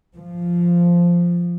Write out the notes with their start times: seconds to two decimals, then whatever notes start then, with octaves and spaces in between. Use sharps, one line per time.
0.14 F3